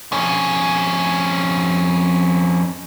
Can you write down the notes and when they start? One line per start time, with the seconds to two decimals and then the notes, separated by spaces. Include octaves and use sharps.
0.12 F2 C#4